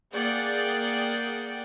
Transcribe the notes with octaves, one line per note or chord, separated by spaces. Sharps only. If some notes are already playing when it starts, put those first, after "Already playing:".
A#3 G#4 D5 F#5 G5